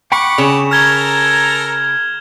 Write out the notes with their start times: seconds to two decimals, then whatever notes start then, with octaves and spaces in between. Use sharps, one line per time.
0.12 F#5 G5 B5 C#6 D6
0.38 C#3 E7 F7
0.71 A4 A#4 A#5 F6 G#6 G7